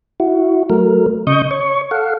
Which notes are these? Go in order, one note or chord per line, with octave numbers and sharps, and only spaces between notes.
E4 F#4
F#3 A3 A#4
C#3 D#5 C#6 D#6 G6
C#5 C#6
A4 F5 F#5